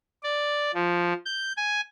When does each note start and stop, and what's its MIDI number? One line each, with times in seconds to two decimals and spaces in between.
0.23 0.71 74
0.74 1.13 53
1.26 1.53 91
1.57 1.81 80